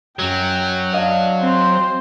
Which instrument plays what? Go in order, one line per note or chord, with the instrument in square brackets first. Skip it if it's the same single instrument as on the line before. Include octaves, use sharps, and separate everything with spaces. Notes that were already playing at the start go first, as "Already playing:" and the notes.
[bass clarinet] F#2 [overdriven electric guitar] F#3 [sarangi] G5
[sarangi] D4 [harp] D#5 F5
[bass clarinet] C4 [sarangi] C5